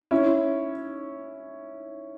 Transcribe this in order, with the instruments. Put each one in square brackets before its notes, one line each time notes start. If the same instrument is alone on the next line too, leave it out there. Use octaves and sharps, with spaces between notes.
[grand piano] C#4 E4